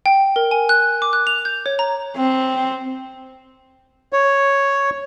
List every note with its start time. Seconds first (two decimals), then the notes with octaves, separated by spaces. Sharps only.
0.06 G5
0.36 A#4
0.51 G#5
0.69 F#6
1.02 D6
1.13 F#6
1.27 F7
1.45 G6
1.66 C#5
1.79 A#5
2.17 C4
4.13 C#5